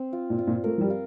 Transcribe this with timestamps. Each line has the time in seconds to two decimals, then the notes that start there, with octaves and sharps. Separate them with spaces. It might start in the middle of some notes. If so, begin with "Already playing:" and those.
Already playing: C4
0.13 F4
0.30 A#2
0.39 F4
0.47 A#2
0.64 A3 A#4
0.78 F3
0.81 G3
0.90 F4